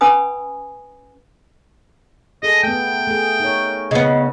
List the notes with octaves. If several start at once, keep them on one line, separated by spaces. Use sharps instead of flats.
C#4 B4 G#5 B5 D#6
G#4 A4 D#5
A3 B3 G5
A3 G#4
D#4 A#4 C#5
C#3 B3 D#5